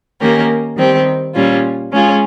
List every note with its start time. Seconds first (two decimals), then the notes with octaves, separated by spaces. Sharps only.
0.21 D#3 A#3 C#4 G4 A#4
0.77 D#3 G3 C4 G4
1.34 A#2 G3 C#4 F4
1.92 G#3 C#4 F4 G#4